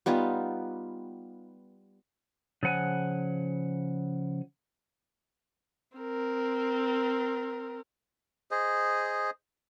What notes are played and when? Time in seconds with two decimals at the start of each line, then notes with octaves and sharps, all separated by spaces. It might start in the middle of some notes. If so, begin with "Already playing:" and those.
0.06 G3 B3 D#4 F4
2.63 C#3 F3 F#5 G#5
5.97 C4 A#4
8.51 G#4 C5 D#5